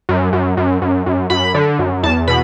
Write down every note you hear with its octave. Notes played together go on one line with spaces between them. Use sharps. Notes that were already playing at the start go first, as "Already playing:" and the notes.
F#2
F#2
F#2
F#2
F#2
F#2 B5
D3
F#2
E2 A5
B2 B5